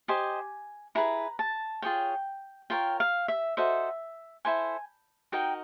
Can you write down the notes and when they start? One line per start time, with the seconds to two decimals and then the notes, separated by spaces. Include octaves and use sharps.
0.08 G4 C5 D#5 G#5
0.95 E4 G#4 B4 A#5
1.39 A5
1.82 F4 G#4 C#5 G5
2.70 F4 A#4 C#5 G5
3.00 F5
3.28 E5
3.57 F#4 A4 C5 D#5 E5
4.45 E4 A4 C5 G#5
5.32 D#4 F#4 A#4 D#5 G5